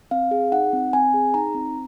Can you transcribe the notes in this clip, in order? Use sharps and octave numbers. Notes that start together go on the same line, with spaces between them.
C4 F5
G#4
D#4 F#5
C4
C4 G#5
G#4
D#4 A#5
C4